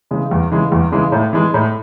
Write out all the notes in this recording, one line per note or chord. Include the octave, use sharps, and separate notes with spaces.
C#3 E3 G#3
E2
C#3 E3 G#3
E2
C#3 E3 G#3
A2
E3 G#3
A2